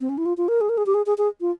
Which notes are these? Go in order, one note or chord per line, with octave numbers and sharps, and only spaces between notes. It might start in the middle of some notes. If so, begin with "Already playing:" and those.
C4
C#4
E4
F4
F4
A#4
G#4
A#4
G#4
G4
G#4
G#4
G#4
F4